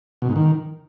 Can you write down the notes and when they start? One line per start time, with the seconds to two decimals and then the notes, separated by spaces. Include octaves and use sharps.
0.22 B2
0.29 G#2
0.36 D#3